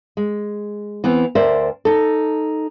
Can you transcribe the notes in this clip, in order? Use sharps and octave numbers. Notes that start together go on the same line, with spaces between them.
G#3
E3 B3 C4
D2 A#4 C5 D5 E5
D#4 A4